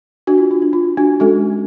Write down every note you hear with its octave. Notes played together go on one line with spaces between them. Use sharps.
D4 F#4
F4
F4
D4
F4
D4 F#4
G#3 C#4 F#4 A4